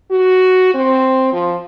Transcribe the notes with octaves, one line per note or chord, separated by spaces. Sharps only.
F#4
C4
F3